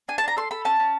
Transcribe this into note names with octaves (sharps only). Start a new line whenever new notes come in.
D4 G#5
A5
D4 A#5
A4 C6
A4 B5
C#4 A5
C#4